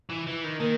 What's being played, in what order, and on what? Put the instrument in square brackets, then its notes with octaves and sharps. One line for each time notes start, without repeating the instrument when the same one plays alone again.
[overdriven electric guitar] E3
E3
D#3
[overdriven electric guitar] D#3 [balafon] A#3 A#4